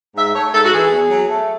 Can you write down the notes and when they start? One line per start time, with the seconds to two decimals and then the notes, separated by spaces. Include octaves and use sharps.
0.16 G#2 E5
0.35 A3 C#5
0.53 G#2 A4
0.66 F#4
0.73 E3 G#4
0.91 E2
1.10 F#3
1.29 A3